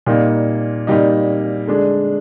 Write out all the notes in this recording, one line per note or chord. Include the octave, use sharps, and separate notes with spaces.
A#2 G3 A#3 D#4
A#2 G3 A#3 D#4
D3 G#3 D4